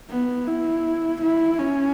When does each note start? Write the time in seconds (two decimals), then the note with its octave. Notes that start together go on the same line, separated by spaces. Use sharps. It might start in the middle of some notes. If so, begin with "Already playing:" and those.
0.10 B3
0.48 E4
1.22 E4
1.58 C#4